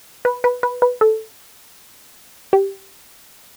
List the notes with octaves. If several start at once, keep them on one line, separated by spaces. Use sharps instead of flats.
B4
B4
B4
B4
A4
G4